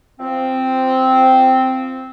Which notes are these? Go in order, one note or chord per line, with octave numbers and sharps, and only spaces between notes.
F3 C4